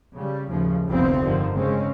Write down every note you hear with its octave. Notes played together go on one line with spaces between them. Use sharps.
C#3 G3
D#2 A2 C#3 F3
F1 C2 D3 F3 B3 C4
G2 D3 D#3 F3
C#3 G#3 C4 C#4